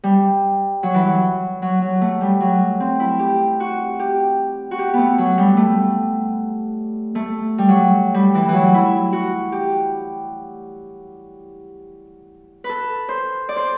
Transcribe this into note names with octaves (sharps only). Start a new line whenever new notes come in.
G3
F#3
E3
F#3
F#3
F#3
A3
G3
F#3
C4
E4
G4
F#4
G4
F#4
G4
A3 B3
F#3
G3
A3
A3
G3
F#3
G3
E3
E3 F#3
E4
F#4
G4
A4 B4
C5
D5
C5